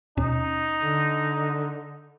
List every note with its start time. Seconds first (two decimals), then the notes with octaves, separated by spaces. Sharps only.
0.17 D#2 B2 C#4 D#4
0.83 D3